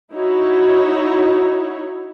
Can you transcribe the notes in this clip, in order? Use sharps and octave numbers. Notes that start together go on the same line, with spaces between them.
D#4 E4 F#4 C#5